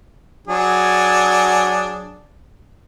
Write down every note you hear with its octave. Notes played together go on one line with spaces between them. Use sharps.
F#3 D4 G#4